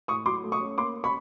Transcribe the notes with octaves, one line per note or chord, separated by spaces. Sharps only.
A2 C#6 D#6
F#3 C6 D6
A3
C#6 D#6
C#4
A#3 C6 D6
C#4
B5 C#6